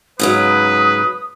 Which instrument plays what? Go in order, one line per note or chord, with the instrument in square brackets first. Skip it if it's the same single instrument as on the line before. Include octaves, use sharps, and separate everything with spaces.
[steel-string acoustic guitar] G#2 C#3 F#3 [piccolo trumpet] B4 [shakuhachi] D#6